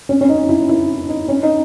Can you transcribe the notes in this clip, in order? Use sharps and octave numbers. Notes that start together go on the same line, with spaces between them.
C#4
C#4
D#4
E4
E4
D#4
C#4
D#4